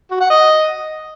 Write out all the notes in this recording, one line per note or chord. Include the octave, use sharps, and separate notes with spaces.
F#4
F#5
D#5